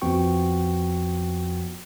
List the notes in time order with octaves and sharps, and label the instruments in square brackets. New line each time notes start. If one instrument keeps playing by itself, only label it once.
[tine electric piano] F2 F3 B3 F#4 G5 C#6